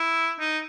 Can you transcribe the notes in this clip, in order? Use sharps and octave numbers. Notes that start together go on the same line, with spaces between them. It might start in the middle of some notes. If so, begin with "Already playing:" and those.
Already playing: E4
D#4